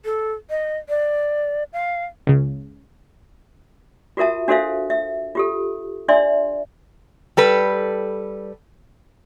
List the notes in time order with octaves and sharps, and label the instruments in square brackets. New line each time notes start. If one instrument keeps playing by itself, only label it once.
[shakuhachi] A4
D#5
D5
F5
[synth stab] C#2 C#3
[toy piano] F4 F#4 A#4 E5 A5
D4 F#4 A4 C5 E5 F5
E5
F4 G4 A4
D4 D5 E5 C6
[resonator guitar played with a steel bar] G3 A4 B4